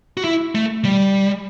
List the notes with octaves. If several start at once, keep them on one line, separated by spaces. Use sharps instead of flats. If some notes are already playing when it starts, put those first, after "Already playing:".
F#4
E4
A3
G3